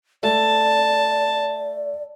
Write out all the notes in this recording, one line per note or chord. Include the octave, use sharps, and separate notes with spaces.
A3 D5 A5